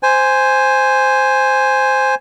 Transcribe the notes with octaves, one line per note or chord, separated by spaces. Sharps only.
C5 G#5